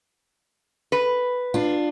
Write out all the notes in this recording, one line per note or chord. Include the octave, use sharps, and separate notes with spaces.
B4
D4 F4